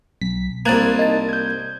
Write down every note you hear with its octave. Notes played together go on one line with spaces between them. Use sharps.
B1 B6
C2 A#3 A5 F#6 G#6
D#4 A5
G6 G#6